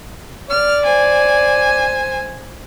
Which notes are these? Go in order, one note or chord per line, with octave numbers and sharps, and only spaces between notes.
D5 F6
C5 G#5